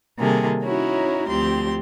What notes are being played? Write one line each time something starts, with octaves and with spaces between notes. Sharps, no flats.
C3 D#3 G3 A#3 G#4 A4
C#4 D#4 E4 F#4 A#4 C#5
D2 F3 C4 G4 C6